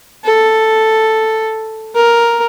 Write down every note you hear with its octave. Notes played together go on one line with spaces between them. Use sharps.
A4
A#4